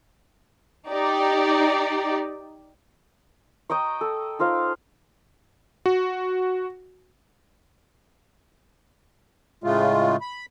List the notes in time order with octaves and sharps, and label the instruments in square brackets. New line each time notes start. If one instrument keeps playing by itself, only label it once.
[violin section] D#4 G4 D5
[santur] D#5 G5 A#5 C#6
A4
D#4 F4 C5 F5
[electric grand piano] F#4
[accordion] A2 C#3 G#3 A3 F4
B5